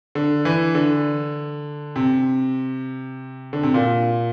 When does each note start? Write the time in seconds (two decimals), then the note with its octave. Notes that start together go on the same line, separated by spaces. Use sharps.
0.15 D3
0.45 E3
0.75 D3
1.96 C3
3.53 D3
3.63 C3
3.74 A#2